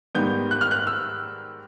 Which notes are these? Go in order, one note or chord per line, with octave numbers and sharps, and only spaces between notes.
G#2 D#3 G3 B3 G6
F#6
F6
F#6
E6